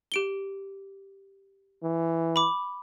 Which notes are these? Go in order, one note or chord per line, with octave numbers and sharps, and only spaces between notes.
G4 D7 G7
E3
B5 D6